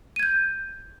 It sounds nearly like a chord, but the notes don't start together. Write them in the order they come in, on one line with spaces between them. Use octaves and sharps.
D#7 G#6 G6